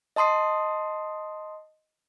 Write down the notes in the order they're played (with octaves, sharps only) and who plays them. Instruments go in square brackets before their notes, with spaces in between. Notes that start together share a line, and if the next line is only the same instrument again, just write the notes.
[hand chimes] D#5 A5 C6 D#6 C7